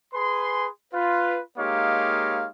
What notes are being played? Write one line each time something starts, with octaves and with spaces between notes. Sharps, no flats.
G#4 B4 G#5 C6
F4 B4
G#3 A#3 D#4 G4 C#5 F5